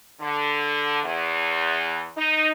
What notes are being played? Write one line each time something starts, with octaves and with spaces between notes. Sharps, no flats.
D3
E2
D#4